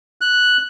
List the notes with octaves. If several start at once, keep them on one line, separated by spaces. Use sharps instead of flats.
F#6